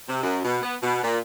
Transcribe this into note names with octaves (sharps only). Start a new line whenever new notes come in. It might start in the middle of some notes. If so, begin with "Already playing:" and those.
C3
F#2
B2
B3
B2
A#2